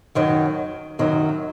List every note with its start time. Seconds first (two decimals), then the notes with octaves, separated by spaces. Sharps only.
0.15 F#2 D#3 F#3
0.99 F#2 D#3 F#3